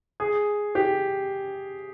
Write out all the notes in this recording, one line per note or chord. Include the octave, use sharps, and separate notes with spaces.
G#4
G4